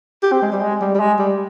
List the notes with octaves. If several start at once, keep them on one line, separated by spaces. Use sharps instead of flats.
G4
C4
G#3
G3
G#3
G3
G3
G#3
G3